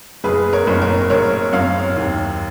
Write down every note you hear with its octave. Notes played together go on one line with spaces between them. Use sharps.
F#1 G#4 B4
A#4 C#5
F#1
A#4 C#5
F#1 A#4 C#5
F#2 C#5 F5
D#2